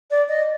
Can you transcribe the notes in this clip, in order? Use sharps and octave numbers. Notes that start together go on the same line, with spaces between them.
D5
D#5